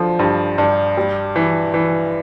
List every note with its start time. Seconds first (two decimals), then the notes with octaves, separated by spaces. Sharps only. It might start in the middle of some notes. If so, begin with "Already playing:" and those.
Already playing: D3 F3
0.19 G2
0.58 G2
0.97 G3
1.36 E3
1.74 E3